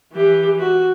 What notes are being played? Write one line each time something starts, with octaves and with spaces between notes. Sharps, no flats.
E3 G4
F#4